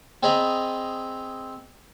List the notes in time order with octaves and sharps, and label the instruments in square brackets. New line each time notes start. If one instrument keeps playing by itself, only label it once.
[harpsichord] C4 G#4 D5 D#5 A#5 B5